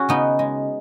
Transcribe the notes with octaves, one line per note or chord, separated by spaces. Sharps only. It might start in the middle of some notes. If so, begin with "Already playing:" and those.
Already playing: C#4 F#4 G#4 C#5
C#3 B3 D#4
G#3